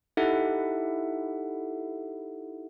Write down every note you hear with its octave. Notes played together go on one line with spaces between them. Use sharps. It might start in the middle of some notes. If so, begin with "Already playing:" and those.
D#4 E4 G4 A4 E5 F#5